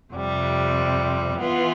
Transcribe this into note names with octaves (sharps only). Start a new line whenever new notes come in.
F2 C3 G3
E3 B3 F4